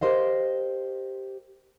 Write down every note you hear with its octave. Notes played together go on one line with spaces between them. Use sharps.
G4 A#4 C5 D#5 F5